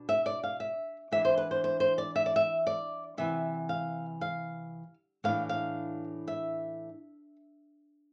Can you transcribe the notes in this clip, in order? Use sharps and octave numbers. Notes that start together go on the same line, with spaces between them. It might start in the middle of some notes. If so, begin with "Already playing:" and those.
Already playing: B2 D4
E5
D5
F5
E5
E3 B3 D4 E5
C5
B4
C5
C5
C5
D5
E5
D5
E5
D5
C3 E3 B3 E5
F5
F5
A2 E3 B3 D4 F5
F5
E5